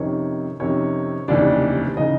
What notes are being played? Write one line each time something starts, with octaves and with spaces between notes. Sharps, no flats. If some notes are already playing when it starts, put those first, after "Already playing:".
Already playing: F2 C3 D#3 C#4 C#5
F2 C3 D#3 C#4 C#5
F1 D#2 C#3 E3 D4 D5
C#3 E3 D#4 D#5